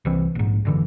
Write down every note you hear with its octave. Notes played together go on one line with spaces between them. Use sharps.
C2 E3 C4
A#1 G#2
F#1 D3 E3